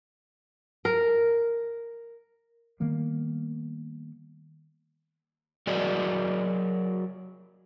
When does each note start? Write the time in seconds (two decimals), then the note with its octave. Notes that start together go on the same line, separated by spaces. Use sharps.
0.85 A#4
2.80 D#3 G3 A#3 B3
5.67 F#3 F#4 G#4 A#4 D5 D#5